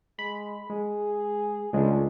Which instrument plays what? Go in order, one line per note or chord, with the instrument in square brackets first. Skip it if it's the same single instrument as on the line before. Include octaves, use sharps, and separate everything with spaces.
[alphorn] G#3 [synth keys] B5
[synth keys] G#3 [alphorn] G#4
[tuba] C#2 [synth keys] G#3 D4 [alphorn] A3